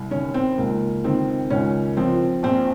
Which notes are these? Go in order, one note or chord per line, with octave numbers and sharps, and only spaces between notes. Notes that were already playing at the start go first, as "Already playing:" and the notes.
Already playing: C2
D#3 C#4
C4
C#2 A#3
D#3 C4
C#2 C#4
F3 C4
A#1 C4